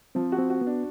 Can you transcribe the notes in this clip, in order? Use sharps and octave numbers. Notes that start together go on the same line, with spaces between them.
F3 C4
F#4
C4
F#4
B3
D4